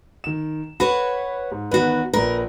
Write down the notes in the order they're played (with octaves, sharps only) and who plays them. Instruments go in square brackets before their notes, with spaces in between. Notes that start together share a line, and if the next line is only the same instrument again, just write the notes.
[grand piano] D#3 E7
[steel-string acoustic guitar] F#4 B4 C#5 [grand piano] B5
[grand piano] G#2
[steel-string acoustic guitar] E2 F#4 [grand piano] D#3 B3 B4
[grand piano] A#1 B4 [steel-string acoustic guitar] A#4